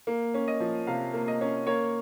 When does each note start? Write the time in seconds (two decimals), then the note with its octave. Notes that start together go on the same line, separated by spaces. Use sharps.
0.07 A#3
0.34 C#4
0.48 D#5
0.60 F3
0.87 C3 F5
1.13 A#3
1.28 D#5
1.41 C#4
1.67 A#3 C#5